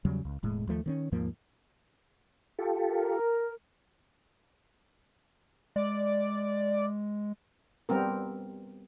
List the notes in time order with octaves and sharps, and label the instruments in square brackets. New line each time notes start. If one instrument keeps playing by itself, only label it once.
[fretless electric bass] E2 C#3 F#3 G3
C#2
E1 A2 G#3
D#2 F3 A3
D#3 C4 C#4
D#2 G#2 F3 A#3
[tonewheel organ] F4 G4 A4
[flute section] A#4
[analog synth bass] G#3 [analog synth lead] D5
[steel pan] G3 B3 C4 A#4